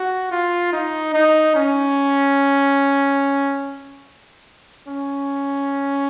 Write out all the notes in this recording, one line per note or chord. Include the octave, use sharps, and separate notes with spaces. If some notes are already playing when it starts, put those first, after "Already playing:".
Already playing: F#4
F4
D#4
D#4
C#4
C#4